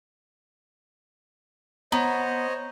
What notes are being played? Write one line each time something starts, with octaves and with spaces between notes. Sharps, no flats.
B3 C5 C#5 D#5 A#5